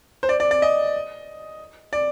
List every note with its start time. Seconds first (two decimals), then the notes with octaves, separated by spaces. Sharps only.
0.23 C5
0.29 D5
0.40 D5
0.51 D5
0.62 D#5
1.93 D5